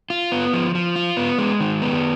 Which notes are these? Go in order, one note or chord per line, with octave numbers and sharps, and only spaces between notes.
F4
B3
F3
F3
F4
B3
G#3
D#3
B3